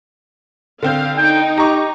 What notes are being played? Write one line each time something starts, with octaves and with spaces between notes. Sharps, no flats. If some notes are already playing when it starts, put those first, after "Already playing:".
D3 C4 F5 G6
D#4 G5
G4 A#5 C#6